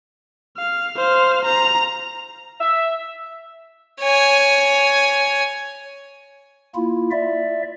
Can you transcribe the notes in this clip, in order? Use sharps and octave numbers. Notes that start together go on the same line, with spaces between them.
F5
C5 F5
A#5
E5
C#5 G#5
A#3 E4 F4
D5 E5